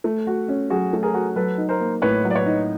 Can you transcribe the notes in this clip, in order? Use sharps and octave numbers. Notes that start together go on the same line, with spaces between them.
A3
F#4
C#4
F#3 F#4 G#4
A3
G#4 A#4
F#4
F#3 A4 B4
D#4
A#4 C5
A#3
A2 B4 C#5
F#3
D5
B4 C#5
D#4